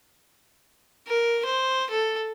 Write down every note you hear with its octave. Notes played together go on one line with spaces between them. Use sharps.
A#4
C5
A4